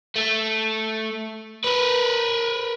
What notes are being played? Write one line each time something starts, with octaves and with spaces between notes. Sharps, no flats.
A3
A#4 B4